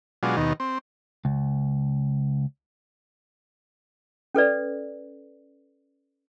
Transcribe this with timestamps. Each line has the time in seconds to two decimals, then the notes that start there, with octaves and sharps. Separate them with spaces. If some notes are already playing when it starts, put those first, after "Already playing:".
0.23 B2 F#3 G#3 D4 F4
0.36 D#2 B2 D#3
0.60 C4
1.25 C#2
4.35 C#4 A4 B4 D5